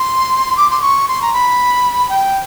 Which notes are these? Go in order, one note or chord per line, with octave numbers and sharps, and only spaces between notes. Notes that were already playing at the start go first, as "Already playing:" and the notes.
Already playing: C6
D6
C6
C#6
C6
A#5
B5
G5